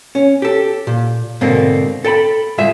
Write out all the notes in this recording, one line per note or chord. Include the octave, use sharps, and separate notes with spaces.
C#4
G4 A4
A#2
G#2 B2 D3 A#3 C4
A4 G5 A5 B5
C2 G#2 G#3 F4 E5 G#5